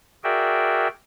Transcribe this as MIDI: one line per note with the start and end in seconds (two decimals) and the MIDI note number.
0.24 0.88 66
0.24 0.88 68
0.24 0.88 70
0.24 0.88 74
0.24 0.88 76
0.24 0.88 79